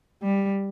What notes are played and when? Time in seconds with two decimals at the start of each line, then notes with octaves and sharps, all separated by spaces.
0.23 G3